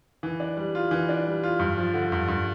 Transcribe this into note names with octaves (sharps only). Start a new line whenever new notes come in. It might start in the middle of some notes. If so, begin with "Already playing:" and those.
E3
D4
G3
F4
E3
D4
G3
F4
G2
F3
D3
G2
G2